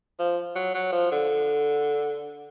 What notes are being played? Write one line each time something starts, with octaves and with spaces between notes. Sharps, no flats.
F3
F#3
F#3
F3
D3